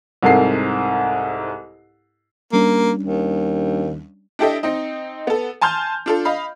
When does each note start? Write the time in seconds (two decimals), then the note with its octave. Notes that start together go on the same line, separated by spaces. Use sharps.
0.23 C2 G#2 A4 A#4 C7
2.53 G3 A#3 C#4 D4
3.03 D#2
4.39 D4 E4 G4 A4 D#5 E5
4.63 C4 D#4 D#5
5.27 B3 A4
5.61 G#5 A5 C6 F6 G6
6.06 D4 F4 A4
6.25 D#5 F5 B5